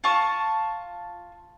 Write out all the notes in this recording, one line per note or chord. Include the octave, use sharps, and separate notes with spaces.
F4 A5 C#6